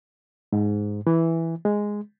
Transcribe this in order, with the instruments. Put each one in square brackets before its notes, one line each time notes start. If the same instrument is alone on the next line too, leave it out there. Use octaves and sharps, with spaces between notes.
[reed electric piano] G#2
E3
G#3